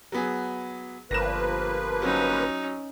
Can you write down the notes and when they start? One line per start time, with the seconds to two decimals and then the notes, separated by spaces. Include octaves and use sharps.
0.12 F#3 B3 G#4
1.11 G1 F3 A#3 B4 A#6 E7
2.02 F#3 C#4 D#4